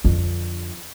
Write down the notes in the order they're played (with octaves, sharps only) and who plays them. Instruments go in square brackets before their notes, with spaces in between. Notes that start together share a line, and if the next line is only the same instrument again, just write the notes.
[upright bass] F2 D3